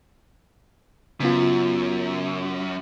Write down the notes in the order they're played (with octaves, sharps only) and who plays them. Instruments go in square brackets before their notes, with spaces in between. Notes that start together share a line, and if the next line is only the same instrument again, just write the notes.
[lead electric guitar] F#2 [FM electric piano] C#3 B3 F4